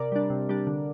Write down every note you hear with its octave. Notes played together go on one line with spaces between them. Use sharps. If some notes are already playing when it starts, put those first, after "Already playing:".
Already playing: C3 A#4 D5
G3 D4
C3
G3 D4
D3